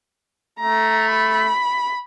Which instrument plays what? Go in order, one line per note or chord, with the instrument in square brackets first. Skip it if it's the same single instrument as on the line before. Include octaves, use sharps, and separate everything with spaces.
[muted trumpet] A3 [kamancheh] A#5
[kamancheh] B5